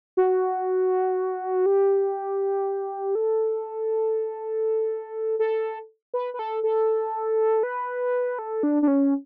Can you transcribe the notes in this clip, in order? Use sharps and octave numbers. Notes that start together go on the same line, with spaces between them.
F#4
G4
A4
A4
B4
B4
A4
A4
B4
A4
D4
D4
C#4